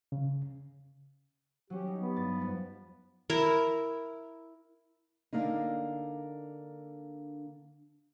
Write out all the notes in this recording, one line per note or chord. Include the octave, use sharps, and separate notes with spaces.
C#3
F#3 C#4 G4
D#4
B3
G2 A6
F2
E4 A#4
D3 A#3 D4 D#4